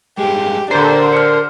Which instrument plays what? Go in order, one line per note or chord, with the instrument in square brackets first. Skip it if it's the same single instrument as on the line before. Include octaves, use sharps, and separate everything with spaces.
[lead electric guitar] G2 G#3 [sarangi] G4
[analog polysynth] D3 C5 [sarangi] D4 [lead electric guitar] A#4 C6 [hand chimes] A#5
[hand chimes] F6 C#7